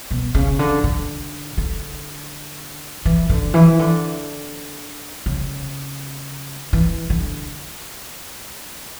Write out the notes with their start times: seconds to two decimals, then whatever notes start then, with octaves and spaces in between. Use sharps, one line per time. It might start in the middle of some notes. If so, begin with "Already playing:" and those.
0.11 B2
0.35 C#3
0.59 D3
0.84 D3
1.58 D3
3.05 E3
3.29 D3
3.54 E3
3.79 D3
5.26 C#3
6.73 E3
7.10 D3